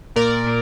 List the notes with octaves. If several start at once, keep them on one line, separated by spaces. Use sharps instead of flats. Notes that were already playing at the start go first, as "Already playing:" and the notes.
A#2 A#4 D5
A#2